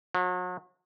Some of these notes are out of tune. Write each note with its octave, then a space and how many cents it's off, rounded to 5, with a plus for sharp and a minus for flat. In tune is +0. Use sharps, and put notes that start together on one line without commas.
F#3 -40